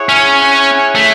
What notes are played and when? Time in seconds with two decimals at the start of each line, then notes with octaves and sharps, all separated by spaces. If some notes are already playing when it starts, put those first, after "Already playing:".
Already playing: E4 G#4 C#5 F#5
0.09 C#4
0.95 A3